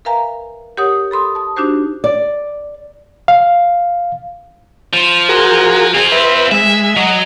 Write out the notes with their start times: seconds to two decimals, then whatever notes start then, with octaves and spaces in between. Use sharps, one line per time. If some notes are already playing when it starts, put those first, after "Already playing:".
0.05 A#4 B4 E5 F5 G#5 A#5
0.77 G4 A#4 C#5 F#5 D#6
1.11 A4 B5 C6 D#6
1.35 A5 D#6
1.56 D4 D#4 F#4 G4 C5
2.04 D5
3.28 F5
4.93 F3
5.29 F#4 G#4 A#4
5.95 C4 F4 G#4
6.12 B4 E5
6.52 G#3 E5
6.97 F#3 D#5